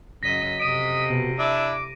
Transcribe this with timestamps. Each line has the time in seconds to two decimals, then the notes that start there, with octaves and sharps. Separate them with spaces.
0.23 F#2 C#3 D#5 A#6 B6
0.60 F2 C3 D#5 D7 D#7
1.10 B2
1.39 D4 E4 E5 D6